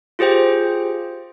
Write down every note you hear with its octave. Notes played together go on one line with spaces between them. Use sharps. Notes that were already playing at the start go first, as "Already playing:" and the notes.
F4 G4 G#4 C5 G5